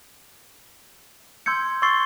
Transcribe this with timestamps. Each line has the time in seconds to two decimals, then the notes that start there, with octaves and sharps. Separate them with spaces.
1.46 C6 E6 G6 G#6 C#7
1.82 C6 C#6 E6 A6 C7 G7